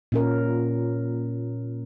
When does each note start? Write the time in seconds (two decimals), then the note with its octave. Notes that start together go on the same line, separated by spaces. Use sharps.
0.12 A#2 C#4 A#4